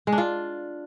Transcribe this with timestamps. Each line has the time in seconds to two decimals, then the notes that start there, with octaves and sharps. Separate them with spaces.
0.07 G#3
0.12 D4
0.18 F4